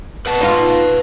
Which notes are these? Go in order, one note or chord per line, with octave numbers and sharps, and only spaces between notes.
B4 F#5 A5
D#4 F4